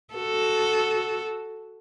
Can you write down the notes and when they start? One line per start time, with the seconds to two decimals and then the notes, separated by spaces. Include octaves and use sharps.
0.14 F#4 A4